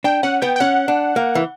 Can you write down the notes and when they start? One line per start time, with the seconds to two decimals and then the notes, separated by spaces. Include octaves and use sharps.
0.04 D4 G5
0.23 C#4 F#5
0.42 B3 G5
0.56 G5
0.60 C#4 F#5
0.88 D4
1.16 A#3
1.35 E3